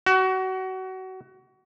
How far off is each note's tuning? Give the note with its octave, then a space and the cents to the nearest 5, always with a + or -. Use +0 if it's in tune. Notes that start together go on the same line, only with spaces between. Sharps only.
F#4 +25